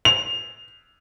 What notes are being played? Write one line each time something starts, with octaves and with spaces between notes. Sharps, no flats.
F7